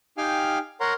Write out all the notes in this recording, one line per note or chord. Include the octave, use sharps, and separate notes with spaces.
D#4 G4 F5 G5 G#5 F6
A#4 C#5 F#5 A#5 C6